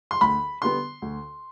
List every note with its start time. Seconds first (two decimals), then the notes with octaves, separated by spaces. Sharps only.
0.11 C6
0.21 D2 B5
0.62 D3 G3 B3 C6
1.02 D2